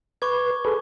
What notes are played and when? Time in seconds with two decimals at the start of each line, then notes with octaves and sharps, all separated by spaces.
0.22 B4 C#6 D6 G#6
0.65 G#4 A4 B4